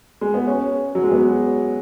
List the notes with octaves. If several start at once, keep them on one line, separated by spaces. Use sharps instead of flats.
G#3
B3
C#4
F#3
G#3
B3